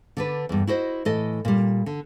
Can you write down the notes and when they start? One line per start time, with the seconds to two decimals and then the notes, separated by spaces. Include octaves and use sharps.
0.17 D3 D4 B4
0.49 E2 G2
0.67 E4 F#4 C5 D#5
1.05 A2 E3 A4 D#5
1.45 A#2 G3
1.86 D3